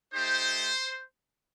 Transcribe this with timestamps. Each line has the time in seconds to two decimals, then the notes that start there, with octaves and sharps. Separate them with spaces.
0.12 A3 D#4 G4 C5